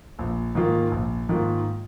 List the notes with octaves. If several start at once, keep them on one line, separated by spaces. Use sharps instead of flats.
A#1
G#2 D#3 A#3 F4
A#1
G#2 D#3 A#3 F4